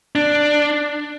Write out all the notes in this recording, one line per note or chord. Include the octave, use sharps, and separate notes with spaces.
D4